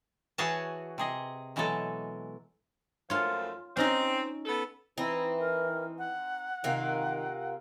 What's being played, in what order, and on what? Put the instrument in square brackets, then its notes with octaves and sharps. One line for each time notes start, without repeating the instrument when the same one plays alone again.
[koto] E3 F#4 G#4 C#5 G#5 A5
C3 G#4 D#5
B2 E3 F#3 G#3 A4
[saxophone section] F#2 F3 A3 [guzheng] F4 C#5
[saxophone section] C4 [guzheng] C#4 D#4 D#5
[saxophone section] B3 A4
[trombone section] E3 [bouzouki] C4 D#4 [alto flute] E4
[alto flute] A#4
F#5
[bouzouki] C3 A#3 F4 [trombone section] D#3